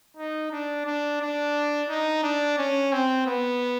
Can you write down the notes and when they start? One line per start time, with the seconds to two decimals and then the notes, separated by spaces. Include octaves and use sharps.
0.17 D#4
0.52 D4
0.85 D4
1.21 D4
1.89 D#4
2.23 D4
2.58 C#4
2.92 C4
3.27 B3